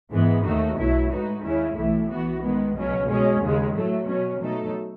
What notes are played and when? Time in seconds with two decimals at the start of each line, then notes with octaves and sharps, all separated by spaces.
0.12 G#2 E3 G#3 B3
0.44 D#2 D#3 A3 D#4 F#4
0.77 B1 B2 F#3 A3 E4
1.10 A2 G#3 D#4 F#4 B4
1.43 D#2 C#3 G#3 C#4 E4
1.76 B1 A2 E3 A3 E4
2.10 E3 B3 F#4
2.42 D#3 G#3 B3
2.75 C#2 B2 F#3 C#4
3.09 B2 G#3 C#4 G#4
3.41 D#2 C#3 G#3
3.75 A2 F#3 A3
4.07 B2 F#3 C#4
4.40 B2 F#3 A3 D#4 A4